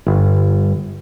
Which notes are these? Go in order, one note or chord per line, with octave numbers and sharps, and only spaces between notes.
G1